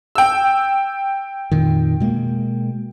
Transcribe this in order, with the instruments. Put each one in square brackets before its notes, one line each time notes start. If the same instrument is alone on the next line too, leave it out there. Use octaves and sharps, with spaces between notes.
[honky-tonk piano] G5 E6
[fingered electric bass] F2 A#2 D#3
B2 G#3 A#3